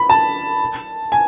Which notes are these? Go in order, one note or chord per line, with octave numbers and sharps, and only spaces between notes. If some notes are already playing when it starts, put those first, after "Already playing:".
Already playing: B5
A5
G#5